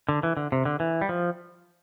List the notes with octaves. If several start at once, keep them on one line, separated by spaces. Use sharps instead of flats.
D3
E3
D3
C3
D3
E3
G3
F3